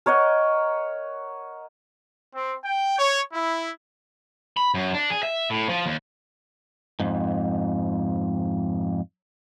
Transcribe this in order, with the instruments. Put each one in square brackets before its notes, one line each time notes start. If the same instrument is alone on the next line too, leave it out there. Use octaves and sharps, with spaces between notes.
[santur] A#4 C#5 D#5 F#5
[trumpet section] C4
G5
C#5
E4
[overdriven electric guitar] B5
F#2
D4
G#4
E5
A2
F3
D#2
[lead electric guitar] F2 G#2